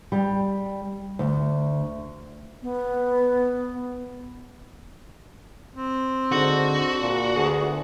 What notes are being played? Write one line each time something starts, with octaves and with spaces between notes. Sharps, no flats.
G3
D2
B3
C4
G#2 D3 F#4
A#2 D4
D2 B3 G#4